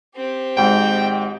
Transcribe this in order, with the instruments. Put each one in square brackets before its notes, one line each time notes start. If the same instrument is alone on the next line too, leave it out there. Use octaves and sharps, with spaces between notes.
[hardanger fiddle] C4 G4
[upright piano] G#1 G#2 [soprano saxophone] G5